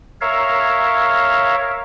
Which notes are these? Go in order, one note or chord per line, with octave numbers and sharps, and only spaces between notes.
A#4 C#5 E5 F5